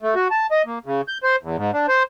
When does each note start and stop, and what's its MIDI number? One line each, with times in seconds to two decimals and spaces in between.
0.02 0.14 57
0.15 0.28 66
0.31 0.47 81
0.51 0.62 75
0.66 0.79 58
0.86 1.01 49
1.08 1.18 91
1.23 1.36 72
1.43 1.57 40
1.57 1.71 44
1.74 1.86 62
1.89 2.03 72